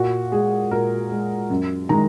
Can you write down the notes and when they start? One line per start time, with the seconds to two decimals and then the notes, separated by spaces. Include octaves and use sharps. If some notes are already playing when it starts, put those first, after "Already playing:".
Already playing: A#2 F#4
0.32 G#3 G#4
0.71 A#2 A#4
1.11 G#3
1.50 F#2
1.89 D#3 G#3 A#5